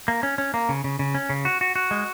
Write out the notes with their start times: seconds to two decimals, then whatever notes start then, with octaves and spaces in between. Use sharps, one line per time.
0.08 A#3
0.23 C#4
0.38 C#4
0.54 A#3
0.69 C#3
0.84 C#3
0.99 C#3
1.15 C#4
1.30 C#3
1.45 F#4
1.61 F#4
1.76 F#4
1.91 G#3